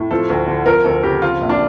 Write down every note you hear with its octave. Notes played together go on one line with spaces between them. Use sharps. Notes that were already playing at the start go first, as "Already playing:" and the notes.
Already playing: A2
F3 A4
D2
D3
F3 A#4
D2 A4
C#3 G4
F3 F4
A#1
D4